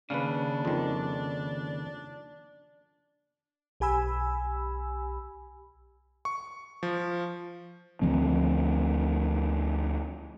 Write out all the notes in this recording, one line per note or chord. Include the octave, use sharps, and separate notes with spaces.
D#2 A#2 C#3 D4 B4 F5
F2 D#3
B1 G4 G#5 B5 E6
C#6
F3
D2 F3 C4